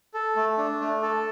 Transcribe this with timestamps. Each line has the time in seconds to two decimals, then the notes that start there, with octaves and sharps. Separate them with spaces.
0.14 A4
0.36 A3
0.57 D4
0.80 A3
1.02 A4